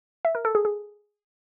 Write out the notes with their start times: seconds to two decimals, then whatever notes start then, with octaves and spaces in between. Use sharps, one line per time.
0.25 E5
0.35 A#4
0.45 A4
0.55 G#4
0.65 G#4